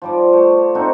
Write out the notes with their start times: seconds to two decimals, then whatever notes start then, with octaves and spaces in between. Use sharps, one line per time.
0.02 F3 G3 D5
0.33 A3
0.75 C4 D#4 F#4 A4